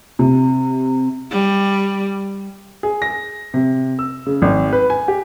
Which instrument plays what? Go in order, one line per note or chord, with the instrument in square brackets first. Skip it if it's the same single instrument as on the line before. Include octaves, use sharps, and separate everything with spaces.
[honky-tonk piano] C3
[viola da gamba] G3
[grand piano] G#4
A#6
C3
E6
C#3
G#1
B4
G#5
G4